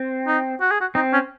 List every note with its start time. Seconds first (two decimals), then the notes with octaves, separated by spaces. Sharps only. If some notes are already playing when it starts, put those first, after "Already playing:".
Already playing: C4
0.27 D#4
0.61 F#4
0.71 G#4
0.81 F#4
0.95 C4 D#4
1.13 C#4